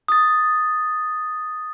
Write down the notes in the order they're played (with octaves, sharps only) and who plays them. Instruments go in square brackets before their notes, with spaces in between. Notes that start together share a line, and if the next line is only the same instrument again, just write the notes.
[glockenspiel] D#6 A6